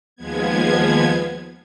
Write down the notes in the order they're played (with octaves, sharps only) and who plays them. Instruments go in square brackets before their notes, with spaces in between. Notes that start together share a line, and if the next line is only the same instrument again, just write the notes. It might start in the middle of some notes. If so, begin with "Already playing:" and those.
[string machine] D#2 F3 G#3 B3 G#6